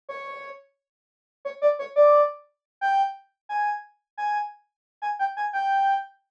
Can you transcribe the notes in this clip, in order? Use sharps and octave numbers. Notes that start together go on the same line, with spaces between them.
C#5
C#5
D5
C#5
D5
G5
G#5
G#5
G#5
G5
G#5
G5